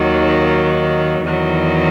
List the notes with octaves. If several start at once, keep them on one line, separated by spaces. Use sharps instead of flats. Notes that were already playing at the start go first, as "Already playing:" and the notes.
Already playing: D#2 D#3 F#3
D#4
E2 D#3 F#3